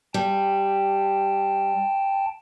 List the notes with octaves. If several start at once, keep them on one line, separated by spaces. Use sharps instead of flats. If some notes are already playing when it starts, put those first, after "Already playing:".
G3 G5 A5